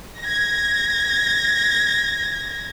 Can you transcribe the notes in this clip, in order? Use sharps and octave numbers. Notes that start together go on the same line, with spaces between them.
G#6 A#6